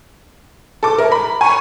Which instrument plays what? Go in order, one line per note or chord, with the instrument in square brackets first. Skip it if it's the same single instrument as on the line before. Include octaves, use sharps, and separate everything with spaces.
[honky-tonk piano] A4 D6
[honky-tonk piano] A#4 [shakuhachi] E5
[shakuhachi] A#5 [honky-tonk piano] B5
[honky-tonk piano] G#5 [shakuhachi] C#6